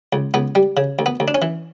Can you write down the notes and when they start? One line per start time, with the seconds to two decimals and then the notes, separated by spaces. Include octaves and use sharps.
0.13 C#2
0.34 C#2 B3
0.55 G3
0.77 C#3
0.99 D2
1.06 B3
1.20 D2
1.28 D4
1.35 C#4
1.42 E3